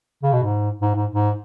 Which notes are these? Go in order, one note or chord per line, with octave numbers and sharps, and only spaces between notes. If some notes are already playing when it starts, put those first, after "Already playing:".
C#3
B2
G#2
G#2
G#2
G#2